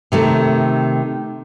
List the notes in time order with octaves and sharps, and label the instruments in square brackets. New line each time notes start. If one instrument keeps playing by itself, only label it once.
[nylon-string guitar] C3 D#3 A3